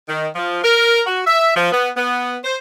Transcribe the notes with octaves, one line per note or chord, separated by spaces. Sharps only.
D#3
F3
A#4
F#4
E5
F3
B3
B3
C5